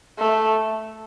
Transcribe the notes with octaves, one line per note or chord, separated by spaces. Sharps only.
A3